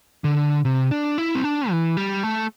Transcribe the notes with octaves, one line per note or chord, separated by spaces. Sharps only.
D3
C3
D4
E4
C4
D4
E3
G3
A3